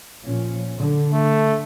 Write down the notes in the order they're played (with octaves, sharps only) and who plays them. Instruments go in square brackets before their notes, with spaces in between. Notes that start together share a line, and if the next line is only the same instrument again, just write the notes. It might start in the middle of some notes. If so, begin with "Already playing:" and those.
[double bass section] A#2 F3 C#4
D3
[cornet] A3